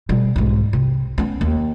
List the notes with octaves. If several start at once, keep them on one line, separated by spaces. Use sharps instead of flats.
B2 G3
B1 G#2
C3
B3 C#4
D#2